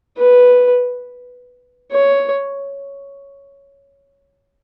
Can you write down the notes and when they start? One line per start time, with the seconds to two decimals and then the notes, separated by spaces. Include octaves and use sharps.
0.18 B4
1.92 C#5